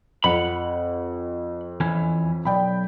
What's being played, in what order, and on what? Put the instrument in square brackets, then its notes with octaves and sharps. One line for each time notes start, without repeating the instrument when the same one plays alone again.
[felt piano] F2 [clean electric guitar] F#5 B5
[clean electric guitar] E2 E3 C#4
[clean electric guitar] B1 [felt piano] D5 G5 B5